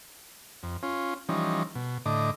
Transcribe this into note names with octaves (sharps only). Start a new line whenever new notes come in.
F2
C#4 F4
E3 F3 G3 C#4 D#4
B2
A2 D3 D#5 D6